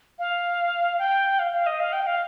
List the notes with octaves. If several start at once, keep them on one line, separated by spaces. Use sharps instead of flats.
F5
G5
F5
F5
D#5
F5
G5
F5